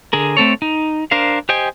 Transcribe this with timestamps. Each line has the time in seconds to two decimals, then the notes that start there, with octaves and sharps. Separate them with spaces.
0.13 D3 G#4 A#4
0.37 A3 C4 A4 C#5
0.62 D#4
1.11 D4 A#4 C5 F5
1.49 G4 C5 D#5 G5 G#5